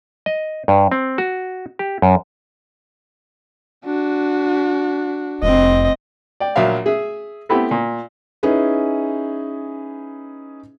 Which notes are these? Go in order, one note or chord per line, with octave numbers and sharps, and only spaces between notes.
D#5
G2
C4
F#4
G4
F#2
D4 F#4
F1 F2 C4 D#5
D5 G5
A#1 F#3 E5 F5
G#4 E5
A3 B3 C4 E4 G4
A#2
C#4 D#4 E4 G#4 B4